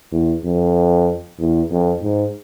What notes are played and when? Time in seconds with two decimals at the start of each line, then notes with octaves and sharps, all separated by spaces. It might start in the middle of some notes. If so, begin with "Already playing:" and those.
0.12 E2
0.45 F2
1.39 E2
1.70 F2
2.02 G#2